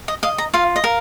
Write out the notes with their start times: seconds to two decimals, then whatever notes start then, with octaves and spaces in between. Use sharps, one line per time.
0.08 D#5
0.23 D#5 F5
0.38 A#5
0.54 F4 F5
0.76 D#5
0.84 A#4 F5